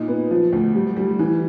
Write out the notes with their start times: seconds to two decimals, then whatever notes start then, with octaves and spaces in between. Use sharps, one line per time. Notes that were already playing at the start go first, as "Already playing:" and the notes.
Already playing: A#2 D#4
0.08 B3
0.31 F3
0.53 D2
0.75 G3
0.97 G3
1.19 E3